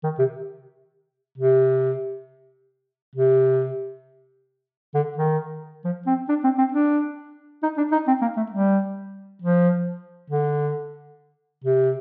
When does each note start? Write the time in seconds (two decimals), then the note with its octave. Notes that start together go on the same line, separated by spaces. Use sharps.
0.04 D#3
0.19 C3
1.38 C3
3.16 C3
4.95 D3
5.18 D#3
5.85 F3
6.07 C4
6.29 D4
6.44 C4
6.59 C4
6.74 D4
7.63 D#4
7.78 D4
7.92 D#4
8.08 C4
8.22 A#3
8.37 A3
8.52 G3
9.42 F3
10.30 D3
11.64 C3